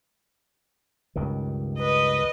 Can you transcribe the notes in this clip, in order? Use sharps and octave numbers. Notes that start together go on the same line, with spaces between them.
C#2 G2 D#3
B4 D#5